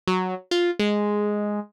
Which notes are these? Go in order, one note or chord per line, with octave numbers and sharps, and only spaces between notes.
F#3
F4
G#3